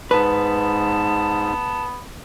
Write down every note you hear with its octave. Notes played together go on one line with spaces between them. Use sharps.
G#2 B3 B4 A5